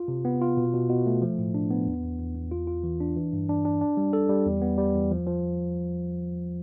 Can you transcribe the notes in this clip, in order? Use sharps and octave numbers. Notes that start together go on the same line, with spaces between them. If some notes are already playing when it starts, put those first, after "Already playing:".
Already playing: F4
C3
B3
F4
B2
B2
B2
A3
F3
A2
D4
B3
E2
E2
E2
E2
F4
F4
E3
D4
E3
G2
D4
D4
D4
G3
A4
G3
E2
B3
G3
E2
F3
F3